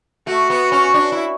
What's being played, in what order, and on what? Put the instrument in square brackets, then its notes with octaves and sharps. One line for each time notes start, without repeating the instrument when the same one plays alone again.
[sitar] A3 [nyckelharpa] F#4
[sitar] B3
C#4
D4
E4